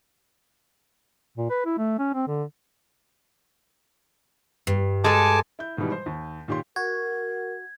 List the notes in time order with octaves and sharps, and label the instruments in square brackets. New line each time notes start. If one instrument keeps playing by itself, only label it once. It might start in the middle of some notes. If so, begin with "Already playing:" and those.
[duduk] A#2
B4
E4
A3
C#4
C4
D3
[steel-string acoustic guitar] G2
[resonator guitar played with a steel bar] G#3 A4 [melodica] G#5 A5 D6
[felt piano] E4 G6
G#2 B2 D#3 E3 G3
C5
D#2
A#2 D#3 G4 C#5 C6
[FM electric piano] F#4 [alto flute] A#4 [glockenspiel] G#6